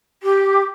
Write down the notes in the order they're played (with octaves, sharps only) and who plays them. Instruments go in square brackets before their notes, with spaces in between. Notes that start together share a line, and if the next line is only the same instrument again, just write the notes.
[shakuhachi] G4